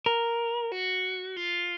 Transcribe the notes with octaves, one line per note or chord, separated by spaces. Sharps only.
A#4
F#4
F4